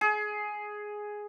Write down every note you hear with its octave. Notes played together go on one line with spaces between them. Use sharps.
G#4